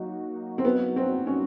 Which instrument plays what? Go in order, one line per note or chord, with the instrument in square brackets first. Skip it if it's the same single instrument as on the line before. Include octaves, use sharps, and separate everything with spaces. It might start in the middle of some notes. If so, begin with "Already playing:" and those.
Already playing: [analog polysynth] F#3 A#3 D#4 F#4
[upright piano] C4
B3
C4
C#4